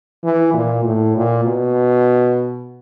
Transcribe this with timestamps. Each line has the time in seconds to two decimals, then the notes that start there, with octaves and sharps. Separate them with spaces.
0.24 E3
0.54 A#2
0.85 A2
1.16 A#2
1.45 B2